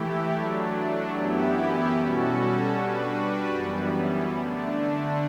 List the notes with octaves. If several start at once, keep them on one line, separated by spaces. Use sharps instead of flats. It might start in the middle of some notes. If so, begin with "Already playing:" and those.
Already playing: E3 A3 E4 G4
F#3 A3 D4
F#2 E3 B3 E4 G4
B2 G3 C#4 F#4 A4
G3 D4 F#4 B4
F#2 E3 G3 B3
D3 A3 D4